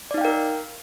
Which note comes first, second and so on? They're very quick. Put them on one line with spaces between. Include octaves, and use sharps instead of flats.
D5 D#4 F5 G5 A#4